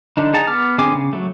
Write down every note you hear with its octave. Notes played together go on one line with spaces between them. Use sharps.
D3 D4 D#4
D#4 G#4 F#5 A5 A#5
B3 D6 F6
D3 C4 G#4 G#5 D6
C#3
F#3 A3